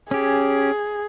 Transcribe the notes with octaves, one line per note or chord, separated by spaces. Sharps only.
C#4 G4 G#4